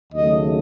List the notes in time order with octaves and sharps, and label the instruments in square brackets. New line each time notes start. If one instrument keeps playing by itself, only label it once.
[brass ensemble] D#2 C#3 F#3 A3 D#5